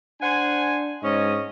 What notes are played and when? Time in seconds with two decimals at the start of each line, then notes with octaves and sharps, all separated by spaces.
0.21 D4 C5 F#5 G#5
1.03 G#2 C#4 D#5